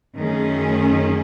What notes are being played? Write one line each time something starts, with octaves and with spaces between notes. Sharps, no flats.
F#2 D#3 A3 C#4 G#4